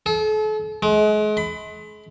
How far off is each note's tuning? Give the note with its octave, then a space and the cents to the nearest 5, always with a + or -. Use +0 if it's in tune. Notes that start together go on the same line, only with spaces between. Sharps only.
A4 -40
G#3 +35
B5 +35